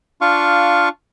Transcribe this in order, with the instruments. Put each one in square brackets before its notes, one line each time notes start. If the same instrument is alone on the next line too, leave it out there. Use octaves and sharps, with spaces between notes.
[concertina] D4 F4 F5 C#6